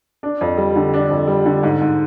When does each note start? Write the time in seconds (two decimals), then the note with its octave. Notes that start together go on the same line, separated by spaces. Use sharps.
0.23 D4
0.41 F2
0.57 G3
0.76 D3
0.93 D4
1.10 F2
1.27 G3
1.45 D3
1.63 G#2
1.81 G#2